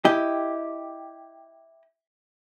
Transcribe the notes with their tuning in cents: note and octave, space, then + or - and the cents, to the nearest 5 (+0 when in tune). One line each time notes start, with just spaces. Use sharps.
E4 +0 G4 +0 D#5 +0